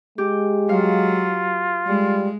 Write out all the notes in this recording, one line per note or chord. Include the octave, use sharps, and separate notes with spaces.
G#3 G4
F#3 F4 F5
G3 G#3